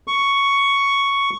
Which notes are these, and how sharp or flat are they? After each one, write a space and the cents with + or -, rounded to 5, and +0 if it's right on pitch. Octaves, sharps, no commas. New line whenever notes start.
C#6 +5